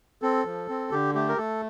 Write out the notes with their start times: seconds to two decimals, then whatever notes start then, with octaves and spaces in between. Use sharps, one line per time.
0.22 C4 A4
0.45 F3
0.69 C4
0.91 D3 G4
1.15 A3 G4
1.29 A#4
1.37 A3 A4